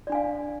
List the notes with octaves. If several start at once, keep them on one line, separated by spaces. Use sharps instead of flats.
D4 D5 F5 G#5